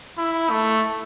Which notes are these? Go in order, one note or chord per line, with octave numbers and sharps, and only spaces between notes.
E4
A3